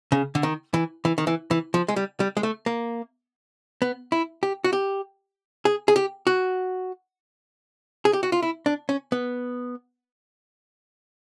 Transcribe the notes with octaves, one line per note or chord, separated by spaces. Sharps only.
C#3
D3
D#3
E3
E3
D#3
E3
E3
F3
G#3
G3
G3
G#3
A3
A#3
B3
E4
G4
F#4
G4
G#4
G#4
G4
F#4
G#4
G4
F#4
F4
E4
D4
C#4
B3